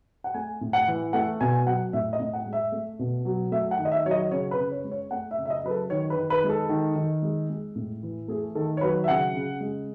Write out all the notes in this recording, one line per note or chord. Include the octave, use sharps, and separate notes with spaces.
F#5
A3 G#5
A2
F#5
E3
A3 F#5
B2 G#5
F#3 F#5
A2 E5
D#5
A2
F#5
G#3
E5
A3
B2
F#3
A3 E5
F#5
D#3
D#5
E5
F#3 C#5
D#5
C#3 C#5
B4
C#3
C#5
G#3
C#5
A3 F#5
E5
C#3
E5
D#5
F#3 B4
A4
D#3 C#5
B4
D#3
B4
G#3
A4
D#3
D#3
G#3
G#3
A2
E3
A3 G#4
D#3 A4
C#5
F#3 B4
E5
C#3 F#5
C#3
G#3